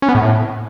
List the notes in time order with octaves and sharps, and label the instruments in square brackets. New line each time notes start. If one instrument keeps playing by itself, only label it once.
[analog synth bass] C#4
B3
A2